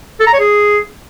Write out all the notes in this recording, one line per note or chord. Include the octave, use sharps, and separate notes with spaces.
A4
A#5
C#5
G#4